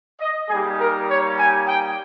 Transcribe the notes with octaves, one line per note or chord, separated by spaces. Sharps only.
D#5
G3 A#3 D#4 G4 G#4
A#4
C#5
G#5
G5